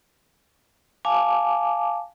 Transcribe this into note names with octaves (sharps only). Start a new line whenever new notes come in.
F5 G#5 A5 D6